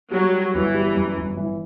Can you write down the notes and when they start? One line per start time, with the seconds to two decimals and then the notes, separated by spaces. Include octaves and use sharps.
0.11 F#3 G3
0.33 G3
0.53 G1 E3
0.74 G3
0.95 F#2
1.17 G1
1.37 E3